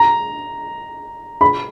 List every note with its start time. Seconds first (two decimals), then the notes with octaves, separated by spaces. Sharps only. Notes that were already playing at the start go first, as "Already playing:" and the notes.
Already playing: A#5
1.41 B5